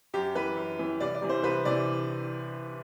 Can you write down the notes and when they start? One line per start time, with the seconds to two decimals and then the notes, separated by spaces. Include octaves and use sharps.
0.14 F#2 G4
0.35 E3 B4
0.57 F#2
0.79 E3
1.00 C2 D5
1.15 D5
1.22 C3 E3
1.29 C5
1.43 C2 B4
1.65 C3 E3 D5